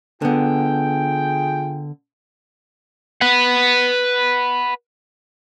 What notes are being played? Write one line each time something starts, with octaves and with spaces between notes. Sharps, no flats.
D3 B3 F4 G#4 G5
B4 F#5